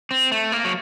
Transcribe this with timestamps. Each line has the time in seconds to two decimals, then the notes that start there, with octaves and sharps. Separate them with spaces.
0.11 C4
0.32 A3
0.52 A#3
0.65 F#3